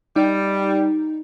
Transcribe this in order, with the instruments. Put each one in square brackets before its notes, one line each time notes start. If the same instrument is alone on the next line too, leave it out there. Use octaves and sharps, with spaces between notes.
[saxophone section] G3 [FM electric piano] D#4